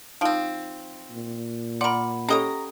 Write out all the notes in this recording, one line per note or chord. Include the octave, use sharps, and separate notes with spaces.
F3 C4 D#4 F5
A#2
A#4 D5 F#5 B5 C6
C#4 G4 A4 C#5 D#5 G5 A#5 D#6